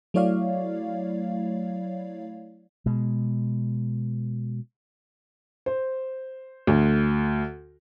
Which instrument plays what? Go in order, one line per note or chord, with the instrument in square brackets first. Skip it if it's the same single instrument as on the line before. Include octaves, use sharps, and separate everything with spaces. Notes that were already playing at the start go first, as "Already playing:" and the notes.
[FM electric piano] F#3 A3 E4 C#5 D5 F5
[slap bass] B2 G#3
[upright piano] C5
D2